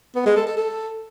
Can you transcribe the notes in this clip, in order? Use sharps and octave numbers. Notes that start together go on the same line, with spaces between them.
B3
G#3
A4
A4
A4